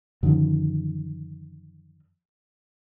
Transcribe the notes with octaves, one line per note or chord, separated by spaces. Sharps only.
F#2 D3 D#3 F3